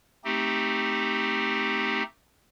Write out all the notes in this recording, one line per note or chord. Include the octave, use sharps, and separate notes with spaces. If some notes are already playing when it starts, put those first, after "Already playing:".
A3 C4 D#4 G4